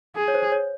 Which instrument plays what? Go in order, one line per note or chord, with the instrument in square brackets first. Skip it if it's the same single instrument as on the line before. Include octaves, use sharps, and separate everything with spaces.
[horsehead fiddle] G#4
[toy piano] C#5
C5
C#5